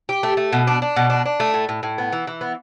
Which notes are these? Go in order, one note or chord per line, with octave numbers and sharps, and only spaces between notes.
G4
A3
A3
B2
D4
D4
B2
D4
D4
A3
A2
A2
A2
B3
E3
E3
B3